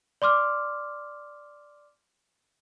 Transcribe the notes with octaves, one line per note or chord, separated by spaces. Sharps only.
D5 C6 D6 F6